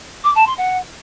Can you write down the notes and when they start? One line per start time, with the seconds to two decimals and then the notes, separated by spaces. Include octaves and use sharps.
0.24 D6
0.35 A5
0.47 C6
0.58 F#5